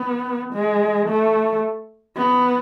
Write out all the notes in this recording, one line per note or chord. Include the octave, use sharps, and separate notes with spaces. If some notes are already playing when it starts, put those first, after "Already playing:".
Already playing: B3
G#3
A3
B3